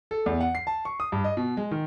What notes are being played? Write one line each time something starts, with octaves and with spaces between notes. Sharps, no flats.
A4
E2
F#5
C7
A5
C#6
D#6
G2
D#5
B2
G#3
D#3